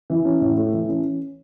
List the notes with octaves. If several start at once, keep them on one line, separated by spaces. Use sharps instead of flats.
E3
C#4
A2
A3
E3
C#4